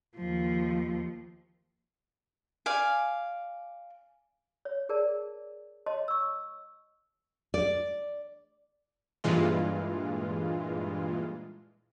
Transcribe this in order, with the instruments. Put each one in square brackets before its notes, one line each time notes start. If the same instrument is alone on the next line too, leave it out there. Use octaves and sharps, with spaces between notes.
[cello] D#2 F3
[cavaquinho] D5 F5 G#5
[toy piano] C#5
G#4 A#4 D5 A5
C#5 D#5 A5 C6
C#6 E6
[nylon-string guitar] D5
[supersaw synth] G2 A#2 E3 G#3 F4